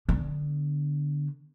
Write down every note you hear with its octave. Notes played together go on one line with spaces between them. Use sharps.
D3 B3